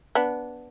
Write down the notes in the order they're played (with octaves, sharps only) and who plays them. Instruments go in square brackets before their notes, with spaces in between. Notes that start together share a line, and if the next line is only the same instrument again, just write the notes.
[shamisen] B3 D4